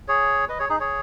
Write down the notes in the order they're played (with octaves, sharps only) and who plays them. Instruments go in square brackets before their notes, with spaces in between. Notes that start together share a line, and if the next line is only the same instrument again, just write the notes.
[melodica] G#4 C#5
B4 D#5
G#4 C#5
D#4 G#4
G#4 C#5